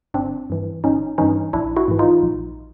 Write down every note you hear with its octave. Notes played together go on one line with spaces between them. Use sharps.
G1 C4 D4
G2 E3
G1 C#4 D#4
G2 E3 C#4 D#4
A#1 D4 E4
E4 F#4
G#2 E3
D#4 F4
A#1